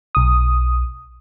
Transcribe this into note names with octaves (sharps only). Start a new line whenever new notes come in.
B1 D#6